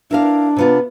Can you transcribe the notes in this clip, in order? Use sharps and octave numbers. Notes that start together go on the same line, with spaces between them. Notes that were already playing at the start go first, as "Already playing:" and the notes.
D4 E4 A#4 F5
C3 B3 F4